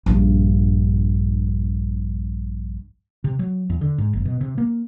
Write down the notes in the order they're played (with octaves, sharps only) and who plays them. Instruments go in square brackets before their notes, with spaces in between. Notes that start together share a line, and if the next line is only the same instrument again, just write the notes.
[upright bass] A#1 G2
[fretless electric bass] C3
F#3
E2
D3
G#2
F#1
B2
C3
A#3